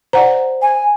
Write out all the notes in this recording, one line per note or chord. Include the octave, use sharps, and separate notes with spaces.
C5 D5 F#5 A#5
G#5